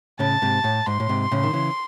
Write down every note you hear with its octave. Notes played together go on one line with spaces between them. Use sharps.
A2 C#3 A5
G#2 C3
A2
G#2 C6
A2
G#2 C3
A2 C#3
D#3
C#3 E3